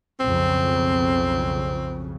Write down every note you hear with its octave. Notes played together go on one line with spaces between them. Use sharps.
B1 F2 C#3 C4